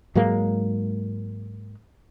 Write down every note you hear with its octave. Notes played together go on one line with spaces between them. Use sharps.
G#2 F#3 G#3 A#3